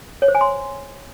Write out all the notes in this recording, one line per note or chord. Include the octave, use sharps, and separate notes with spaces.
C#5
C5
G#5
C6